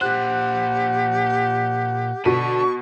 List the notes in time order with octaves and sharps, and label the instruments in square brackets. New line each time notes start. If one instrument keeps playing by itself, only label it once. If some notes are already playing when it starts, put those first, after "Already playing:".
[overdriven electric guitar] A#2 C5 [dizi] G4 [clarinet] F#5 [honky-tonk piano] F#6
[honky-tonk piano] B2 B6 D#7 [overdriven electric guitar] D4 A4 [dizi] C#6